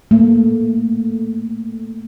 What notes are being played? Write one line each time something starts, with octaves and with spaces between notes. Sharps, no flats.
A3 A#3